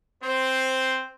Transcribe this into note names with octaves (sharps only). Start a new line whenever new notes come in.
C4 C5